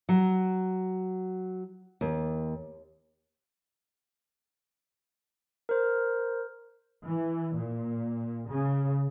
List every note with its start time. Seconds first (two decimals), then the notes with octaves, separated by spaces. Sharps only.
0.09 F#3
2.01 D#2
5.69 A#4 C5
7.04 E3
7.54 A#2
8.48 C#3